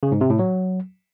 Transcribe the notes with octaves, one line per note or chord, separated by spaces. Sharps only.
C#3
G#2
C3
A2
F#3